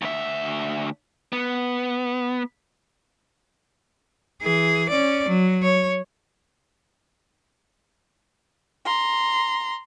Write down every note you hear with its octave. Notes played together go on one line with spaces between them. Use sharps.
D2 E5
B3
E3 G#4
C#4 D5
F#3
C#5
A#5 C6